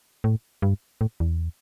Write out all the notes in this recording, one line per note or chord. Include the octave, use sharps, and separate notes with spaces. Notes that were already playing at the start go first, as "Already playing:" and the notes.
A2
G2
A2
E2